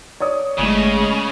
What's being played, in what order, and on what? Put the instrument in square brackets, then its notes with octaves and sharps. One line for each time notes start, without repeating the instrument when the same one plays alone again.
[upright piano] C#5 D5 D#6
[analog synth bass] G1 [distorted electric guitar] C#3 [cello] G#3 A3